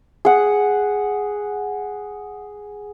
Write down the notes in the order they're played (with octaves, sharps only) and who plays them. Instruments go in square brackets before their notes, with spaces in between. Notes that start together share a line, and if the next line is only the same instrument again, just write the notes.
[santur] G#4 F#5